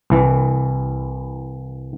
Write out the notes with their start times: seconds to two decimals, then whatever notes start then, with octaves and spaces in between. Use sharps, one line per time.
0.10 C2 E3